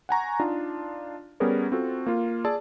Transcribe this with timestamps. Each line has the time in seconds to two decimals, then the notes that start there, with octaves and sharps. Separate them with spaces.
0.09 F#5 G#5 A#5 C#6
0.40 D4 D#4 F4
1.40 G3 B3 C#4 G#4 A#4 C#5
1.72 C4 F4 F#4 A4
2.07 A#3 F4
2.45 G#4 D5 A5 E6